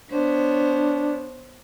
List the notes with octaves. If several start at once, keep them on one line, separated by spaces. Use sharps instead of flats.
B3 D4 C5 C#5